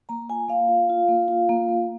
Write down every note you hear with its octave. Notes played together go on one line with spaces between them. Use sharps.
A#3 A#5
F4 G#5
A#3 F5
F4
F4
A#3
F4
A#3
A#3